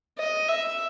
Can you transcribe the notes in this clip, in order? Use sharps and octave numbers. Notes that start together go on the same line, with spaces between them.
D#5
E5